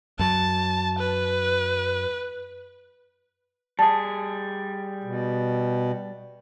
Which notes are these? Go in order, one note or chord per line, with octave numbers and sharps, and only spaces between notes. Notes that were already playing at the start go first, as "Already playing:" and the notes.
F#2 F#3 A5
B4
G3 G#4 A5
B2